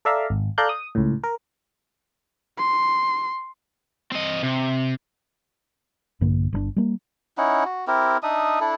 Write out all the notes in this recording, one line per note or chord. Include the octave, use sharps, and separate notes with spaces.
A4 D5 E5 F5 A#5
G#1
A4 D5 F5 A#5 F#6 G6
D#6
C#2 A2
A#4
C6
C4 D#5
C3
A#1 G2 D3 A#3
G1 D3 D4
G3 A#3
C#4 D#4 E4 F#5
F#4
C4 E4 G4 A#4
D4 D#4 E5 D#6
D4 E4 A4